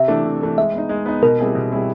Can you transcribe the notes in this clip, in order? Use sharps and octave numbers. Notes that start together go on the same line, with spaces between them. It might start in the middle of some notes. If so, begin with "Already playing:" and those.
Already playing: C3 E5
E3 A3 D4
C3
E3 A3 D4
G#3 E5
B3 D#4
G#3
B3 D#4
B2 A#4
G3 C4 E4 G#4
B2
G3 C4 E4 G#4